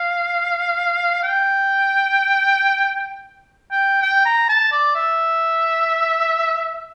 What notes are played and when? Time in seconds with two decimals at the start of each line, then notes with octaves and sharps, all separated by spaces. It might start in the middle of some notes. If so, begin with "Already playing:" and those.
Already playing: F5
1.23 G5
3.71 G5
4.02 G5
4.25 A#5
4.49 A5
4.72 D5
4.95 E5